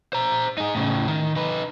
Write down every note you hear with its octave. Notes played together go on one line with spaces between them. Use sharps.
C5 A#5
D#4 G#4
A2 C#3
D#3
D#4 B4